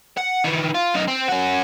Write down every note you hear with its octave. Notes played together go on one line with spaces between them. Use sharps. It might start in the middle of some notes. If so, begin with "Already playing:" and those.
F#5
D#3 E3
F4
F#2 D#4
C4
C#4 F#4